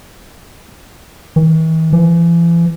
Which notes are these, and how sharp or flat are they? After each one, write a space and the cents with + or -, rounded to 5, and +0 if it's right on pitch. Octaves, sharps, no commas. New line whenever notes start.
E3 -45
E3 +40